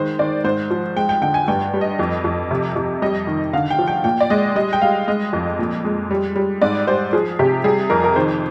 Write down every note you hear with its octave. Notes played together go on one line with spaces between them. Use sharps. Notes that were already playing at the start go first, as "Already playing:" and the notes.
Already playing: D#3 G#3 C5
D#3 D5
G#2 C5
F3
G#3 G5
G5
D3 G5
G#5
G2 G5
G3
D#5
F2
F2
C3
F2
G3 D#5
D#3
D3 F5
G5
F3
G5
A#2 G5
D5
G#3 D#5
G3 D#5
G5
G3 F5
G#3 D#5
F2
A#2
G#3
G3
G3
G#2 D5
G3 C5
F3 G#4
C3 G4
G3 G#4
F2 A#4
A#4
D#3 C5